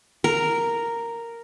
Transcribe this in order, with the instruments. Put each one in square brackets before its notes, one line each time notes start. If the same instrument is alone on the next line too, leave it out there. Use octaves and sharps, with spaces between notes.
[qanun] A#4